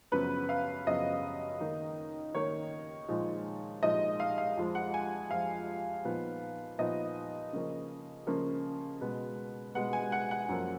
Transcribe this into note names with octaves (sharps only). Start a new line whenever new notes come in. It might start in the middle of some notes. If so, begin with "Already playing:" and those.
F#2 C#3 F3 B3 B4
F5
F#2 C#3 F3 B3 D#5
D#3 A#3 D#4
D#3 A#3 D#4 C#5
A#2 F3 G#3 D#4
A#2 F3 G#3 D#4 D#5
F5
F5
F2 F3 G#3
F#5
G#5
F2 F3 G#3 F5
A#2 F3 B3 D#4
A#2 F3 B3 D#4 D#5
C#3 F3 A#3 C#4
C#3 F3 A#3 C#4
B2 G#3 B3
B2 G#3 B3 F#5
G#5
F#5
F#5
F#2 F3 A#3